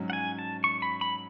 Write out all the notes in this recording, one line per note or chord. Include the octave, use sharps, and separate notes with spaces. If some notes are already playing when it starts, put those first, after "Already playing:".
Already playing: G#2 F#3 C#4
F#5
G#5
A5
C#6
B5
B5